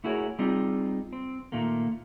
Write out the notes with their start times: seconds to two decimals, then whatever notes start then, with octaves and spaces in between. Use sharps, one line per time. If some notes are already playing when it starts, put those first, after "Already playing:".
0.04 A3 E4 F#4 G#4 A#4 C#5
0.39 G3 C4 D#4 F4 G#4
1.13 C4
1.52 A#2 D#3 A3 A#3